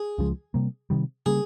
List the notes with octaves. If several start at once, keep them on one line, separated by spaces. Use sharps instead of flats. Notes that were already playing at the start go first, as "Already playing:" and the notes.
Already playing: G#4
C#2 C#3 F3 G#3
C3 G3 A#3
C3 D#3 G3
C#3 G3 A#3 G#4